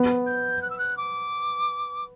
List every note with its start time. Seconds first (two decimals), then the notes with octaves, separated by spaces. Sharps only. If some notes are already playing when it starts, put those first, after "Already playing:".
Already playing: B3
0.26 G6
0.62 F#6
0.70 E6
0.78 F#6
0.97 D6